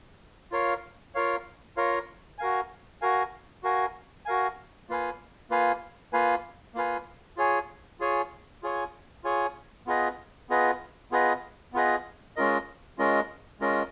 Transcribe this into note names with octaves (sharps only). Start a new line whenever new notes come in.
F4 A#4 C#5 F5
F4 A#4 C#5 F5
F4 A#4 C#5 F5
F#4 A#4 F5 G#5
F#4 A#4 F5 G#5
F#4 A#4 F5 G#5
F#4 A#4 F5 G#5
A#3 F4 B4 F5 G#5
A#3 F4 B4 F5 G#5
A#3 F4 B4 F5 G#5
A#3 F4 B4 F5 G#5
F4 G#4 C#5 G#5
F4 G#4 C#5 G#5
F4 G#4 C#5 G#5
F4 G#4 C#5 G#5
B3 F4 G#4 B4 D#5
B3 F4 G#4 B4 D#5
B3 F4 G#4 B4 D#5
B3 F4 G#4 B4 D#5
G#3 C#4 F4 A#4 D#5
G#3 C#4 F4 A#4 D#5
G#3 C#4 F4 A#4 D#5